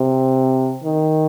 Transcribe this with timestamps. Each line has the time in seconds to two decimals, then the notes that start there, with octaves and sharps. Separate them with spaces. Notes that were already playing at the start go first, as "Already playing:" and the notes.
Already playing: C3
0.84 D#3